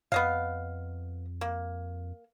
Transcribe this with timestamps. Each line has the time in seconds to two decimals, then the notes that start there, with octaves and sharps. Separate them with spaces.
0.12 F2 B3 D#5 F5
1.41 A#3